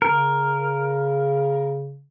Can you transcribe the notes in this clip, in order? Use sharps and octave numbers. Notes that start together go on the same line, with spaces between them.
C#3 A#4